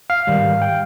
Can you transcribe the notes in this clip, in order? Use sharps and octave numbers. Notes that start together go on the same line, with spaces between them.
F5
G#2 D#3 G3
G5